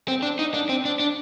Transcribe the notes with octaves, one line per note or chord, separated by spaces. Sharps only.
C4
D4
D#4
D4
C4
D4
D4